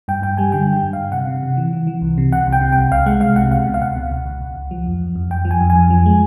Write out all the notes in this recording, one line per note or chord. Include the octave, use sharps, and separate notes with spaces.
G2 G5
G2 G5
G3 G#5
D3 G5
G3
G5
G2
G2 F5
C3 F#5
C3
C3
E3
E3
E3
C2
C3
C3 F#5
C2
G5
C3
C2 G5
C2 F5
G#3 F#5
C2 F5
C3 F#5
C#2 F#5
B2
F5
C#2 F#5
B2
C#2
C#2
C#2
C#2
F3
F2
F2
F2
F2 G5
F3
G#5
F2
G#5
F2
F3
G#3